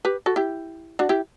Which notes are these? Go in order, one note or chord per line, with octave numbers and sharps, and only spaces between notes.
G4 B4
F#4 A4
E4 G4
D4 F#4
E4 G4